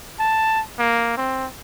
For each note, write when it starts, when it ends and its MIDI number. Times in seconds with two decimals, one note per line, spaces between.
0.20 0.62 81
0.79 1.14 58
1.17 1.47 60